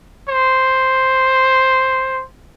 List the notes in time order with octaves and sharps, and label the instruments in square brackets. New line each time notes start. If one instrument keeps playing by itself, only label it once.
[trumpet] C5